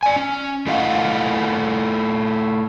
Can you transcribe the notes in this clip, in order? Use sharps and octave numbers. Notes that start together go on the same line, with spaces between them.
D5 G#5
C#4
A3 E4 F4 D#5 F5 F#5